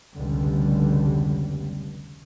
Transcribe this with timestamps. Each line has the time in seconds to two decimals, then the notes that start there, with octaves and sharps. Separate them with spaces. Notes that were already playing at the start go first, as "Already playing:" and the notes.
0.14 F1 C#2 B2 D3 G3